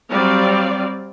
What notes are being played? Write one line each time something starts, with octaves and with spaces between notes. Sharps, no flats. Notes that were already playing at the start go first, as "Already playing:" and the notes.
F#3 G3 C4 D5 F5